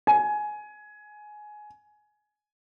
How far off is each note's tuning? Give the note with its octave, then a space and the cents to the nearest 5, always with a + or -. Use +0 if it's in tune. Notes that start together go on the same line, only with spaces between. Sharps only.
G#5 +15